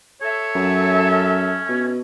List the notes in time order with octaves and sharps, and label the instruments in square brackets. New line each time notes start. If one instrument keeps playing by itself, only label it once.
[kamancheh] A4 E5 [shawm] C#5
[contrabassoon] F#2
[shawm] C#4
[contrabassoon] B2